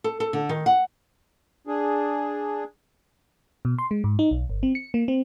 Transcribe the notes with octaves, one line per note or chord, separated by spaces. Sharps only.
A4
A4
D3
D#3
F#5
D4 G#4
B2
C6
G#3
G#2
D#4
B1
G1
C4
C#7
A#3
C4